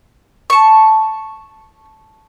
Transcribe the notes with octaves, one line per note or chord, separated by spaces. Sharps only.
A5 C#6